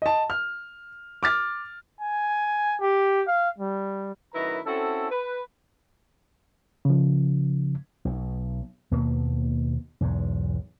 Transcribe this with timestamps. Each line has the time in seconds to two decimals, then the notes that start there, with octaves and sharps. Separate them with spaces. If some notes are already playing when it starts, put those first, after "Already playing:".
0.02 D#5 A5
0.30 F6
1.23 D6 F6 A6
2.01 G#5
2.81 G4
3.27 F5
3.58 G3
4.34 F#2 A2 D#3 E4 B4 A#5
4.65 C4 C#4 E4 F#4 A4
5.10 B4
6.85 C#3 F3
8.05 B1
8.91 D#2 B2 A#3
10.01 B1 E2 G#2